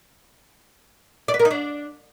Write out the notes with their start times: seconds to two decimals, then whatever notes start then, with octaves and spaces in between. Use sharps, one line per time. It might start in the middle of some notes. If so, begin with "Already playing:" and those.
1.28 D5
1.34 B4
1.39 A#4
1.45 D#4
1.51 D4